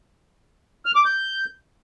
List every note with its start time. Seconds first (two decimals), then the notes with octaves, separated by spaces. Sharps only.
0.85 F6
0.95 D6
1.05 G6